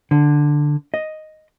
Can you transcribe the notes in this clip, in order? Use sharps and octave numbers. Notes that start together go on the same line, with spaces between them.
D3
D#5